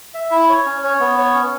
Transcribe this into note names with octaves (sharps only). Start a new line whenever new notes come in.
E5
E4
C#5
C#4
C#5
B3
C#5
C#4